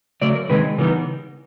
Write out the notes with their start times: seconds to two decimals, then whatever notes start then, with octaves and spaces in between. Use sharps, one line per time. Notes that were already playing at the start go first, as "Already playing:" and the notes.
0.21 C#3 F#3 A3 D5
0.35 A#4
0.49 C3 D#3 G#3 C4 D#4 B4
0.78 C#3 E3 G3 B3 D#4 A#4